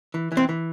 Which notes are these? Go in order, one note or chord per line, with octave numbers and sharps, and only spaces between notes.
E3
E3
C4
E3